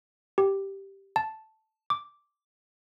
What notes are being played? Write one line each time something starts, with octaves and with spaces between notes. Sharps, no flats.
G4
A5
D6